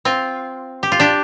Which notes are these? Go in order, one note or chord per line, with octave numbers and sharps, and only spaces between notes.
C4 F4
G4
F4
D4 G4